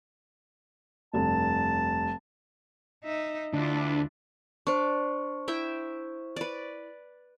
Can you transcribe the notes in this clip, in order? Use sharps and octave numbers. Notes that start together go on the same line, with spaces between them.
F1 G2 A5
D#4 E5
D2 D4 E4 F4
D4 C5 C#6
E4 E5 G5
B4 D5